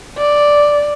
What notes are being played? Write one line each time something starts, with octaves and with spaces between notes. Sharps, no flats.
D5